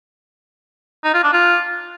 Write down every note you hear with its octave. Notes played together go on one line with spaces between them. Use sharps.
D#4
F4
D4
F4